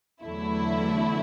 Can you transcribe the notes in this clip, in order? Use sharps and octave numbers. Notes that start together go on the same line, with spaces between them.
E2 D3 F#3 A3 E4